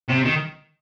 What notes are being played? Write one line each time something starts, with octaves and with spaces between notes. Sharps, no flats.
C3
D#3